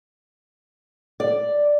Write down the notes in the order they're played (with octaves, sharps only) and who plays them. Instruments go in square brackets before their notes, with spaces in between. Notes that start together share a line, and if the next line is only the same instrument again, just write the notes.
[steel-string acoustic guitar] D5